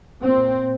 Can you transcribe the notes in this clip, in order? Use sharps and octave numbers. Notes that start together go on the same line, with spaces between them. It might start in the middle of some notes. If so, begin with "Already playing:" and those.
A#2 C4